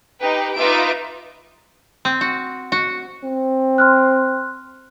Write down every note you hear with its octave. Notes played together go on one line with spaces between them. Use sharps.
D#4 G4 B4
D#4 F4 B4 E5 D6 D7
C4
F#4
F#4
C4
C6 F6 F#6